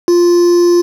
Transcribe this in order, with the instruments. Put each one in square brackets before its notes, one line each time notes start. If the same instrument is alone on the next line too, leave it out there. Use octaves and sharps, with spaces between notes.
[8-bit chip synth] F4